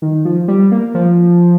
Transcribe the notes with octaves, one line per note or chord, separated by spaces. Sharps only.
D#3
F3
G3
A#3
F3